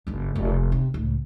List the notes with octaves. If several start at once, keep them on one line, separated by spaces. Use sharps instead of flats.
F#1 G2
F1
C3
C#2 A2